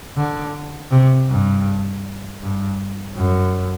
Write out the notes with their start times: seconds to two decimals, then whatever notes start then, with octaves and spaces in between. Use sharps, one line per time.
0.17 D3
0.91 C3
1.29 G2
2.42 G2
3.16 F#2